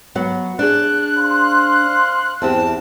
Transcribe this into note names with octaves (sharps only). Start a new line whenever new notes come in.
F#3 B3 F#5
D4 G#4 F#6
C5 F5 C6
E2 C4 G4 A5